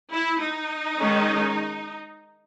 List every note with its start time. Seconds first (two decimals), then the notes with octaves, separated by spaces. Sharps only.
0.13 E4
0.41 D#4
0.98 D#3 G#3 C#4